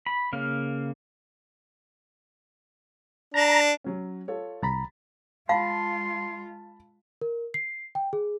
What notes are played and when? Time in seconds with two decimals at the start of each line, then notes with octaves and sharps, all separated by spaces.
0.06 B5
0.33 C#3 A#3 F5
3.34 D4 A#5
3.84 F#3 C#4
4.28 F4 A4 C#5
4.63 C2 A#5 B5 A6 B6
5.49 G#3 F4 F5 A5 B5 C6
7.21 A#4
7.54 C7
7.95 G5
8.13 G#4